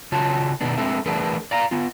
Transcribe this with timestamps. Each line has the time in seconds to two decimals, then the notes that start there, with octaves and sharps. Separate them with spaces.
0.12 C#3 F4 F#4 C#5 A5
0.61 B2 D#3 B3 D4
0.78 G#3 C4 D4 A4 E5
1.06 E3 A3 D4 G#4 A#4 B4
1.51 D5 F5 A#5
1.71 B3 F4